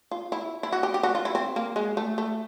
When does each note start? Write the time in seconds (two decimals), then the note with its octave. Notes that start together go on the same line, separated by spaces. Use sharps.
0.11 F4
0.32 E4
0.63 E4
0.72 F#4
0.83 G4
0.94 G4
1.03 F#4
1.15 F4
1.25 E4
1.35 C4
1.56 A#3
1.76 G#3
1.97 A3
2.18 A3